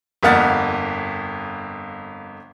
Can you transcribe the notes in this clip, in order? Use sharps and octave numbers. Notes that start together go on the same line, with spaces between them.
G1 F2 A#3 F#5 F6 A6